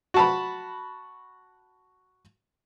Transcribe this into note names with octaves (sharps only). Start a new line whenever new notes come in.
F#4 A5 B5